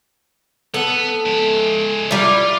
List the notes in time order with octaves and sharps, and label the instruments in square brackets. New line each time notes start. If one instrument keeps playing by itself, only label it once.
[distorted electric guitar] B3 [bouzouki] A4
[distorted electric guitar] G#3 E5
[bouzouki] G3 E4 [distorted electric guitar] F4